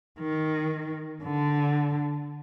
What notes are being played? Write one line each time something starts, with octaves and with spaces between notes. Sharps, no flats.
D#3
D3